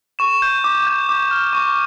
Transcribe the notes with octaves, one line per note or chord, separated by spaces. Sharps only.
C#6 E7
G6
D6
G6
D6
F6
C#6